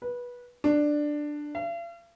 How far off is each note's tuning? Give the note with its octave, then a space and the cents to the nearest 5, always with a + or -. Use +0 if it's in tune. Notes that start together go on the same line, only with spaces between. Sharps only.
B4 -20
D4 +10
F5 -45